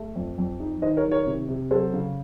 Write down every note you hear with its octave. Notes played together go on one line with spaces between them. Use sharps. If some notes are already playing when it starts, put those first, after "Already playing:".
Already playing: A3
F2
F2
D#4
D#3 C5 D#5
A#4 C#5
D#3
A#4 C#5
C3
C3
F#3 A4 C5
C#3